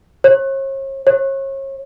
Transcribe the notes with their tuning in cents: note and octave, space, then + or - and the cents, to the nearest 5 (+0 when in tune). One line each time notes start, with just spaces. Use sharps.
C#5 -40
C#5 -35